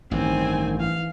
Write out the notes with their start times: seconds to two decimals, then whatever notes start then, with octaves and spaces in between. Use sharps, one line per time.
0.11 A1 G2 D#3 C4 G#5
0.80 E3 F5